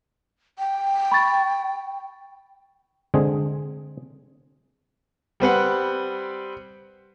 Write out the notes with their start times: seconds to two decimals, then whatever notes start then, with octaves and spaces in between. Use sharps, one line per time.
0.59 G5
1.12 B5 C#6 A6
3.14 D3 G#3 C4 G#4
5.40 G3 C4 B4 F#5